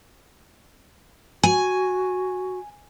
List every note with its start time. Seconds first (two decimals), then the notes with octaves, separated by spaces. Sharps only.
1.43 F#4 G#5